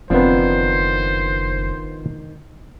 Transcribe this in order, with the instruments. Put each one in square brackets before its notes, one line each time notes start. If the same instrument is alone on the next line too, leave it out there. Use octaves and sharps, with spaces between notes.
[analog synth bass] F#1 [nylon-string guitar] D#3 C4 D4 [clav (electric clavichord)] F3 B3 [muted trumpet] C5